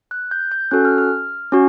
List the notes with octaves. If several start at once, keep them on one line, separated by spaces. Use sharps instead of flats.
F#6
G6
G6
C#4 F#4 A4 F#6
F6
F6
C#4 F#4